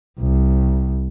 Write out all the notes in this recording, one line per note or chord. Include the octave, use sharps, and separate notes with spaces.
C2